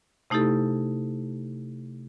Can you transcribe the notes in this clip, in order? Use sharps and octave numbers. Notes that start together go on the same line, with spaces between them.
C3 A3 D#4 E4 G4 A4